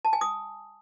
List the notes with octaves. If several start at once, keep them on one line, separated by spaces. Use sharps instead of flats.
A5
G#5
D#6